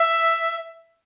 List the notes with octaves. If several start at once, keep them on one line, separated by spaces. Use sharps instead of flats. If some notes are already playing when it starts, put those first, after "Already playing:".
Already playing: E5